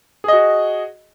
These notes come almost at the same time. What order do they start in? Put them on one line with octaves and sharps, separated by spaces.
G#4 D#5 F#4